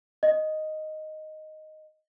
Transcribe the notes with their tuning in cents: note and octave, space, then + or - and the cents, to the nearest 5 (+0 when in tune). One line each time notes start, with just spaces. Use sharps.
D#5 +0